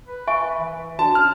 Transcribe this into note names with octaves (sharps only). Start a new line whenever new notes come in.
B4
E5 G#5 C#6
E3
D4 F#4 A5
C#4 F6